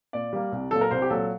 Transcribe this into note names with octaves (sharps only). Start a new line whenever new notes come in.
A#2 D5
G3 A#3
C2
A#2 F#3 A4
A#4
C2 C5
G4
A#2 F#3 A4